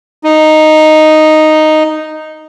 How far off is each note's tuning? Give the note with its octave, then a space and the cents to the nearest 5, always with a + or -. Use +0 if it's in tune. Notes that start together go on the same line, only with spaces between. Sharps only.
D#4 -5